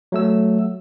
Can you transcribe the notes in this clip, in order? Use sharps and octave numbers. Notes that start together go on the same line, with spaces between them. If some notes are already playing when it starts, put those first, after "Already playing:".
F#3 A3 E6